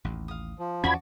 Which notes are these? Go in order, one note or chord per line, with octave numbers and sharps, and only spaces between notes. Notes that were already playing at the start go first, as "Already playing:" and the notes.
A1 D#2
F5 D#6
F3
E2 C#4 F#4 D5 B5 G#6